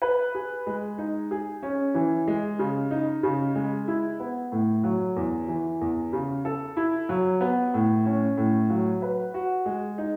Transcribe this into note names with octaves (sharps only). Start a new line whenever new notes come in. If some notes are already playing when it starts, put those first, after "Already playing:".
B4
G#4
G#3
D#4
G#4
C#4
E3
G#3
C#3
D#4
C#3
G#3
E4
B3
A2
F#3
E2
E3
E2
C#3
A4
E4
F#3
B3
A2
C#4
A2
F#3
B4
F#4
G#3
D#4